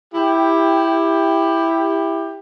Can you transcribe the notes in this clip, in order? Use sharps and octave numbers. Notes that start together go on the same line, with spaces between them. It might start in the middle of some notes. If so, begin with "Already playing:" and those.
E4 G4